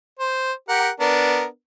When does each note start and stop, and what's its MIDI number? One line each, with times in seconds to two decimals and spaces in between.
0.20 0.52 72
0.69 0.89 67
0.69 0.89 70
0.69 0.89 78
1.00 1.45 59
1.00 1.45 62
1.00 1.45 70